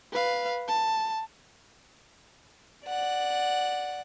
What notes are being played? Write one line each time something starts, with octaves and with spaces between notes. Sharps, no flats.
B4 F5
A5
D5 F#5